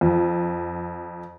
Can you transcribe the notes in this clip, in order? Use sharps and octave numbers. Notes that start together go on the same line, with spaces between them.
F2